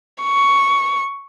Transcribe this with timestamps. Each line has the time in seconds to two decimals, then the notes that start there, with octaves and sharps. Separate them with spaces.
0.23 C#6